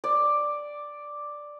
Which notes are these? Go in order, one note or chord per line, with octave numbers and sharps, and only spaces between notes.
D5